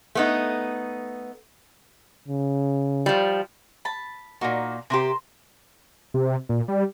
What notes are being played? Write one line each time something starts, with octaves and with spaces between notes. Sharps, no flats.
A3 B3 D#4
C#3
F3 G3
A5 B5
A#2 A#3 D#4 F#4
C3 G4 A#4 C5 C6
C3
A#2
G3